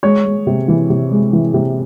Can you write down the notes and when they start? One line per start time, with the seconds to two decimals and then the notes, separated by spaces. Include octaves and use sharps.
0.03 G#3 C#5
0.25 G#3
0.47 C3
0.68 E3
0.90 C3
1.11 G#3
1.33 E3
1.54 C3